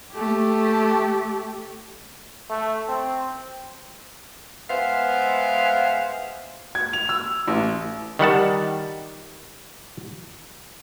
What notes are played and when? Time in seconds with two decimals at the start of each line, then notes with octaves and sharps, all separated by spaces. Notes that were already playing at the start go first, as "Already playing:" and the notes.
0.13 A3 G4
2.50 A3
2.89 C4
4.70 G#3 B3 C5 E5 F5
6.75 G#6
6.93 F7
7.09 E6
7.47 A1
8.19 D#3 G3 F#5 A5